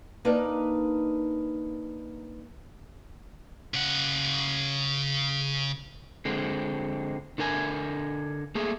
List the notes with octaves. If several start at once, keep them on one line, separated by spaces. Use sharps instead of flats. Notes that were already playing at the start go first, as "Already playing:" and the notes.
A#3 D4 D#4 A#4 B4
C#3 F#5
D3 G#3 C4
D3 D4 A#4 G#5
A3 A#3 G#4